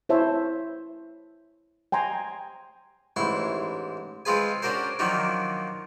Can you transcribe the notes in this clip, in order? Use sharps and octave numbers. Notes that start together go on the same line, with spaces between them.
E4 C5 C#5 E5 A5
G5 G#5 A#5 C6
A1 G#2 E4 C6 C#6
G#3 C4 F4 G#4 B4 G#5
C#4 D4 F#4 A#4 C5
D#3 F3 F#3 A#3 D4 D#4